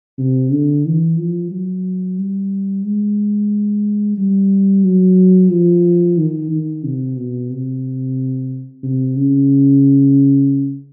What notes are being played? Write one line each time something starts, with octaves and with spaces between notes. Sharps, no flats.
C3
D3
E3
F3
F#3
G3
G#3
G3
F#3
F3
D#3
D#3
C3
B2
C3
C3
C#3